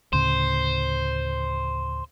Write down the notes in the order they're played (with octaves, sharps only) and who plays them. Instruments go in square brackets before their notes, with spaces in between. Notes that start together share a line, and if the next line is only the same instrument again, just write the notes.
[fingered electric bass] D2 A2 C#3 [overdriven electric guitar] C5